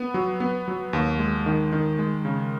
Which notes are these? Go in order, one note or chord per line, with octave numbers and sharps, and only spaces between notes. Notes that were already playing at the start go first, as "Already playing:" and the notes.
Already playing: B3
F#3
B3
F#3
D#2
G#3
D#3
D#3
G#3
C#3